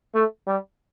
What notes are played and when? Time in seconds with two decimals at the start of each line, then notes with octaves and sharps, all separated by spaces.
0.15 A3
0.47 G3